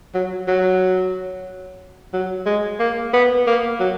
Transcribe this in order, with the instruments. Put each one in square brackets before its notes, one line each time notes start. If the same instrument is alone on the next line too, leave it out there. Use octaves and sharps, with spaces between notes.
[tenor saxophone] F#3
F#3
F#3
G#3
A#3
B3
A#3
F#3